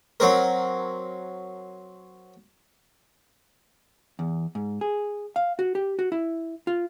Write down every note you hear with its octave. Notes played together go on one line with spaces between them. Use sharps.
F#3 C4 A#4
E2
G#2
G#4
F5
F#4
G4
F#4
E4
F4